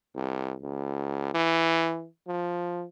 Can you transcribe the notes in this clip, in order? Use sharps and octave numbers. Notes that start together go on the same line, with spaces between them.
C2
C#2
E3
F3